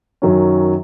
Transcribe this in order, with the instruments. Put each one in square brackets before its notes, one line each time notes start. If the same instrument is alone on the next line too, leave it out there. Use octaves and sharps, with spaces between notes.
[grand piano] F#2 D#3 F#3 C#4